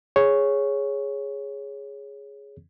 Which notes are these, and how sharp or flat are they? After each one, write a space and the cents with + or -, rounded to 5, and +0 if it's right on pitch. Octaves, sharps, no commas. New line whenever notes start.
G#4 +0 C#5 +0